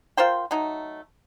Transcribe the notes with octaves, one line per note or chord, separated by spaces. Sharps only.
F4 A#4 C5 G5
F#3 A3 D#4